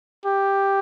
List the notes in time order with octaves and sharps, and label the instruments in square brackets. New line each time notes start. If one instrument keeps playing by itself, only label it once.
[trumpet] G4